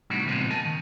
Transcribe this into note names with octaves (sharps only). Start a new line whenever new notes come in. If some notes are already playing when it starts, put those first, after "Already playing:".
A2 C3 G3 D4 D#4 F#4
A#2 C#3 F3 G#3 B3 C4
A#4 G#5 A5
D#3